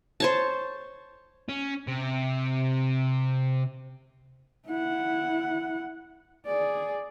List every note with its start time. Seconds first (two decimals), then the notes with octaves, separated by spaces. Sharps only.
0.20 C5 C#5 A5
1.49 C#4
1.87 C3
4.67 E4 F#5
6.46 G#4 D5